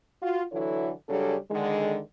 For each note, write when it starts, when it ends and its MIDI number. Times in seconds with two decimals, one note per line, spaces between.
0.22 0.43 65
0.22 0.43 66
0.52 0.91 50
0.52 0.91 52
0.52 0.91 54
0.52 0.91 64
0.52 0.91 69
0.52 0.91 73
1.09 1.37 49
1.09 1.37 54
1.09 1.37 55
1.09 1.37 61
1.09 1.37 62
1.09 1.37 69
1.50 1.99 50
1.50 1.99 51
1.50 1.99 56